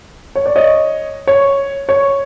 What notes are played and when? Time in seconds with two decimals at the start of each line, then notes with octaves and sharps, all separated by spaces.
0.35 C#5
0.46 D5
0.56 C#5 D#5
1.27 C#5
1.89 C#5